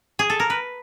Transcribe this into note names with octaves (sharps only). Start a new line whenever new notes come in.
G#4
A4
A#4
B4